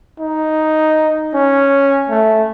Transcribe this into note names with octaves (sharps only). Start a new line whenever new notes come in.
D#4
C#4
A3